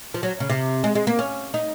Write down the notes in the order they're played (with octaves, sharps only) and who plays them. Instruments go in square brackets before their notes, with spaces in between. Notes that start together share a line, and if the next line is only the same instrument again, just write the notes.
[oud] F3
F#3
C#3
C3
G#3
G#3
A#3
C#4
D#4